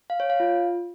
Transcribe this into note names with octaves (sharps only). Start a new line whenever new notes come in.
F5
C#5
F5
F4